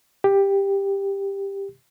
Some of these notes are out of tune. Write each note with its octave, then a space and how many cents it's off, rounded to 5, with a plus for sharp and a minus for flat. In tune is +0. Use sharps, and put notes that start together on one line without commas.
G4 +10